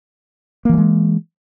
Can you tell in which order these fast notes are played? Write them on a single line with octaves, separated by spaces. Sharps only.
A#3 E3 F#3 G#3